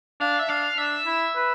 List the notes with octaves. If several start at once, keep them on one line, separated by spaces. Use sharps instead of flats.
D4 F5
E5
D4 F5
D4 E5
E4
B4